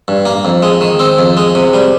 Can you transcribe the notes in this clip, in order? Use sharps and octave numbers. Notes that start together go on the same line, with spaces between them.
G2
A#3
F2
G#3
D#3
C4
F2
G#3
C3
G3